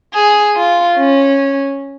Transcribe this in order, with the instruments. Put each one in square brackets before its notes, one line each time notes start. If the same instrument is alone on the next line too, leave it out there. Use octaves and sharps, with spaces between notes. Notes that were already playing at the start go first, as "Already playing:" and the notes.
[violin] G#4
F4
C#4